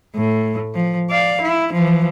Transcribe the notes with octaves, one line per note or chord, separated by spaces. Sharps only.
A2
F3
D5 F5
E4
E3 F3